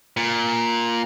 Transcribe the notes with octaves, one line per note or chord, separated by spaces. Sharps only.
A#2